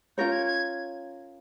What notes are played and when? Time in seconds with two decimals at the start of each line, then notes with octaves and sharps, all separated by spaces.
0.18 C#4 F4 A#4 C#5 G6
0.32 G#6
0.46 G#6